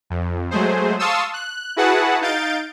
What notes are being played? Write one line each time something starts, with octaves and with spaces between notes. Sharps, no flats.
F2
F#3 G#3 A3 G#4 C5
F5 A5 C6 C#6 D#6 E6
F#6
E4 F#4 G#4 B4 F#5 A5
D#4 F5 G6 A6 D7